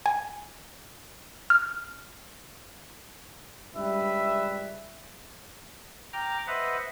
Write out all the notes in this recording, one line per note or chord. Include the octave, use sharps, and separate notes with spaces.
G#5
F6
C#2 G2 G3 B4 E5
G5 A#5 D6 F6
B4 C5 D#5 E5 F#5